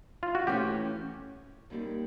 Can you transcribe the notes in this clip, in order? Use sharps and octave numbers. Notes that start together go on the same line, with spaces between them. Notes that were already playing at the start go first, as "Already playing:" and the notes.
F4
F#4
E3 A3 C#4 G4
D#2 D#3 G3 A#3 C#4